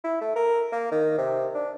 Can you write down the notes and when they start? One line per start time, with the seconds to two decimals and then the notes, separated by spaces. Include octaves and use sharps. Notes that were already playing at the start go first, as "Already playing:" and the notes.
0.04 E4
0.21 A3
0.36 A#4
0.72 A#3
0.91 D#3
1.18 C3
1.55 D4